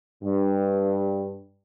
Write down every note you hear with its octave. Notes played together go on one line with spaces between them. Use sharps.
G2